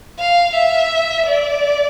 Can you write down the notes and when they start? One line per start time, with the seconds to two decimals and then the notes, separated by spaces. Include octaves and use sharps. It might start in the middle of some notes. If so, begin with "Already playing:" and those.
0.19 F5
0.55 E5
1.27 D5